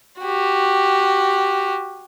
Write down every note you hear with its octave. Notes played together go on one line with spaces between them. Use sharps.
F#4 G4